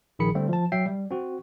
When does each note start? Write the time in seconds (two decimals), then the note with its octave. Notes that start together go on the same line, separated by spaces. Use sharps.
0.19 A#1 D#3 G#4 B5 C#7
0.35 D3 G3 A3 C4
0.49 F3 A5
0.72 F#3 E5 G5 C7
0.86 G3
1.10 C4 F#4